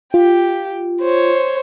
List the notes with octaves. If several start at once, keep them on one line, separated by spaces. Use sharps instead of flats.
F4 G4
C5 C#5